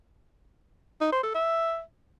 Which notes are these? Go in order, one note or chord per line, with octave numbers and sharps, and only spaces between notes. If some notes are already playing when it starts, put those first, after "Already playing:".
D#4
C5
A4
E5